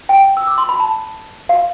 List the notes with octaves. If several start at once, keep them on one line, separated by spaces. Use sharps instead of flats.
G5
E6
D6
C6
B5
A5
F5